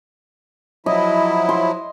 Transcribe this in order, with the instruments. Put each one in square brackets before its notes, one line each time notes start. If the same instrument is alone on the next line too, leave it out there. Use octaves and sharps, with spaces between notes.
[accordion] F3 F#3 E4 [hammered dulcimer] D#5
[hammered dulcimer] C6